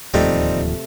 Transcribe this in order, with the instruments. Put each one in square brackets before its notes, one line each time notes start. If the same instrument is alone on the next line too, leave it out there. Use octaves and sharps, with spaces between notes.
[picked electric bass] D1 D#2 F3 [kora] C3 A3 [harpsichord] G3 C4 D#4